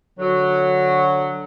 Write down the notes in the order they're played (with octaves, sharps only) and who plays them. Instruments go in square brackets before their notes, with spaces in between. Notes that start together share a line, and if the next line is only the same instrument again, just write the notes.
[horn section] D3 F#3